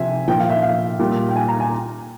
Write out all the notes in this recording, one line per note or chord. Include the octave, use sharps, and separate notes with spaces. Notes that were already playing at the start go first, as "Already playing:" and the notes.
Already playing: C3 F3 E5 G#5
A#2 F3 G5
F5
E5
F5
A#2 G3
G5
G#5
A#5
G#5